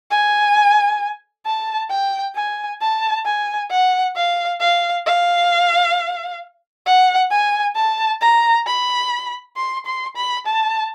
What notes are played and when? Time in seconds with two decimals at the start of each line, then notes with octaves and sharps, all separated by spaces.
0.11 G#5
1.46 A5
1.90 G5
2.35 G#5
2.81 A5
3.25 G#5
3.70 F#5
4.16 F5
4.60 F5
5.06 F5
6.86 F#5
7.30 G#5
7.76 A5
8.21 A#5
8.66 B5
9.57 C6
9.86 C6
10.16 B5
10.46 A5